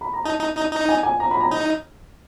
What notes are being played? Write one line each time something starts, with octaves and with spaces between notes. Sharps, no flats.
B5
A#5
D#4 A5
D#4
D#4
D#4
G#5
G#5
A#5
B5
A#5
D#4